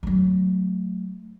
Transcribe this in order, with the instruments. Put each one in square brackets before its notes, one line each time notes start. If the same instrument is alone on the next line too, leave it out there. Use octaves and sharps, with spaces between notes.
[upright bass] F#3 A3